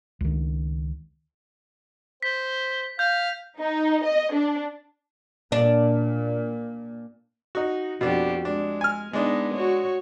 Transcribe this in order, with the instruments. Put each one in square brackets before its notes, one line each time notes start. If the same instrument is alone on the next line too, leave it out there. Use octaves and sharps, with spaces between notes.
[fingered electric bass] C#2 D#3
[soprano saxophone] C5 [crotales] B6
[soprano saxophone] F5 [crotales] G6
[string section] D#4
D#5
D4
[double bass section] A#2 [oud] D4
[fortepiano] D#4 F#4
[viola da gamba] F2 F#4 G4 [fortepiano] B2 D4
[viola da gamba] G#3 [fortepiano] D4
[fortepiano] G#5 F6
[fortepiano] G#3 D4 [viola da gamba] B3 D#4
[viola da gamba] F#4 C#5